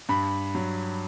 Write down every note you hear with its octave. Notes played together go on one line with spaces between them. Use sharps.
G2 B5
F#3